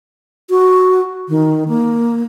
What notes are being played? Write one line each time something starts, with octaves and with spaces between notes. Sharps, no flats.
F#4
D#3
A#3